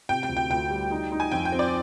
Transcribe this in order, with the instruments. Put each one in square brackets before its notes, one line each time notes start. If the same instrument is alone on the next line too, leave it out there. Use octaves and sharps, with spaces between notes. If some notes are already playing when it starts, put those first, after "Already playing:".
[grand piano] C3 [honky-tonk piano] G5
[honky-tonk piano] G5
[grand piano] D2
[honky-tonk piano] G5
[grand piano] D2 [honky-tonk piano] G5
[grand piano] G3
D#4
D#4
[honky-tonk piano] G#5
[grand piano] F2 [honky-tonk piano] G5
[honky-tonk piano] G5
[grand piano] C4
[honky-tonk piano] D5